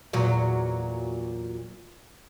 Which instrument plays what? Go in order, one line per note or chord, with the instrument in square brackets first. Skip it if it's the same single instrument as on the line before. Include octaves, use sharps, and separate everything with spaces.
[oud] E2 A#2 F#3